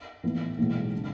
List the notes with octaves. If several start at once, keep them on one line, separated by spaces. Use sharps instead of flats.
A2 E3 B3
B1 A2 E3 G#3
C#3